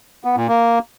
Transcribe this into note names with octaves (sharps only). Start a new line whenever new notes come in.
B3
A#2
A#3